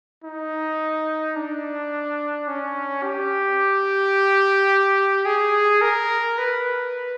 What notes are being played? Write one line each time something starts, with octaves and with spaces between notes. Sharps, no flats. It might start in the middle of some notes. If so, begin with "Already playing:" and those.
D#4
D4
C#4
G4
G#4
A#4
B4